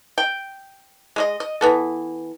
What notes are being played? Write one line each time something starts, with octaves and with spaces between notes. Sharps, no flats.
G5
G#3 A3 D#5
D#5
E3 B3 A4